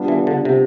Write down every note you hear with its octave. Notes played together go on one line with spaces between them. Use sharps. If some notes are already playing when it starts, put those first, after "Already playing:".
Already playing: G3 B3 D4 F4
E3
D3
C3